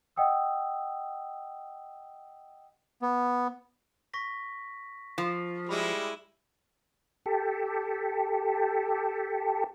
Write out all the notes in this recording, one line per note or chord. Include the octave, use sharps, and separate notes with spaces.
D#5 F#5 G5 D#6 E6
B3
C#6 A#6 B6
F3
G3 G#3 E4 B5 D#7
G4 A4